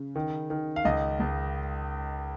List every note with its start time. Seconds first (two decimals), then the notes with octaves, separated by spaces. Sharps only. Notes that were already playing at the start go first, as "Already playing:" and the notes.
Already playing: C#3
0.16 D#3
0.50 D#3
0.76 F5
0.85 C#2 D#5
1.20 C#2